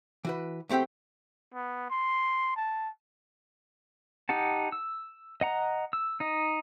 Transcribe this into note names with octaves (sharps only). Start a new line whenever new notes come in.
E3 F#4 B4
E2 A3 C4 G4 G5
B3
C6
A5
D#4 G4 F#5 A5
E6
D#5 F#5 A#5
E6
D#4 D#5